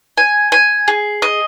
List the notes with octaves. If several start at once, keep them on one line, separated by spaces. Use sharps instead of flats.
G#5
G#5
G#4
D#5